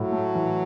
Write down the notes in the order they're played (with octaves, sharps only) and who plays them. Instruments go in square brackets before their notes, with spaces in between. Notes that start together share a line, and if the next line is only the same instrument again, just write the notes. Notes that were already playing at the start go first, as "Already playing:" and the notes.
Already playing: [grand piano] A2 [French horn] F#3
[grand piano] A3
E3